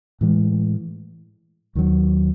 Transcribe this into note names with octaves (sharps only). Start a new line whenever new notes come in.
A2 E3 G#3
D#2 D#3 F#3